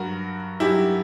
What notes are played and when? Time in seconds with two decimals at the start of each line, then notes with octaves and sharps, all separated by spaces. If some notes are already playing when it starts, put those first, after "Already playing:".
Already playing: G2 F#3 F#4 A#4
0.60 G2 F#3 E4 G4